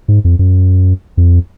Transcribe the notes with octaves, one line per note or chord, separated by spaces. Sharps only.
G#2
F2
F#2
F2